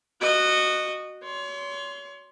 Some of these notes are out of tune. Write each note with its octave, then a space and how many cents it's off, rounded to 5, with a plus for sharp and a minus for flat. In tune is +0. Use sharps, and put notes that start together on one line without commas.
F#4 +0 D#5 -20
C#5 +35 C6 +0